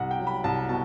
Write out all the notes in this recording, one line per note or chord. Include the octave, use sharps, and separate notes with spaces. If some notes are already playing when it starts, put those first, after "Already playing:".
Already playing: C2 F#5
G5
F#3
B5
C2 A5
B2 A5